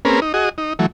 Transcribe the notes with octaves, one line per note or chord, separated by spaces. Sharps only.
A#3 C4 C#4 G#4 A#4 B4
D#4
F#4 G#4 D#5
D#4
E3 F#3 A3